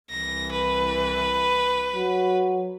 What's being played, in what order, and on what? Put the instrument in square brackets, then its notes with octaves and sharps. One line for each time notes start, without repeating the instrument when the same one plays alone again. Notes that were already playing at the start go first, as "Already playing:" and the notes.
[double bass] C2 E3 [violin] A#6
[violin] B4
[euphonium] F#3